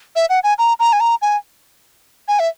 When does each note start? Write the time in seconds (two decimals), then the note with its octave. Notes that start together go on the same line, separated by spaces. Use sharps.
0.16 E5
0.29 F#5
0.44 G#5
0.58 A#5
0.80 A#5
0.93 G#5
1.00 A#5
1.22 G#5
2.28 G#5
2.39 E5